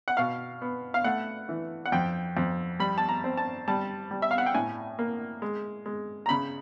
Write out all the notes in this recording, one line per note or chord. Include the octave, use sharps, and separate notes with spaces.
F#5
B2 F5
B3
F5
A3 F#5
E3
F#5
F2 G5
F2
G3 B5
A5
A#5
C4
A5
G3 A5
G3
E5
F5
F#5
G5
A2 G#5
A#3
G#3
G#3
A#5
C#3 B5